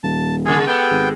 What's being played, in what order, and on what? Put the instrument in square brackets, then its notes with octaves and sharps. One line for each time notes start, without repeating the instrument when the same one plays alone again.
[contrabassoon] D#1 [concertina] A5
[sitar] C#3 G#3 [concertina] G#4
[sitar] G#3 G4 A4 [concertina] B3 G5
[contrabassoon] G#1